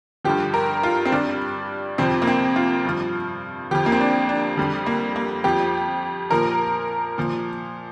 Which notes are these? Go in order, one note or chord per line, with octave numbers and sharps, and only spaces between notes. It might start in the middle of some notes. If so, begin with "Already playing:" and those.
G2 D3 F3 G4
A#4
F4
C4
G2 G3 D4
F2 C3 F3 C4
A#3
C4
F4
G2 F3
F2 F3 G4
A#3
C4
D4
D4
F2 D3 G3
A#3
A#3
F2 F3 G4
A#2 F3 A#4
A#2 F3